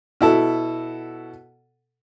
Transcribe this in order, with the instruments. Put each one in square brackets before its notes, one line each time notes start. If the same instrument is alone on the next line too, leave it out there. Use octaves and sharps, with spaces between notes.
[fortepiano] B2 E4 A4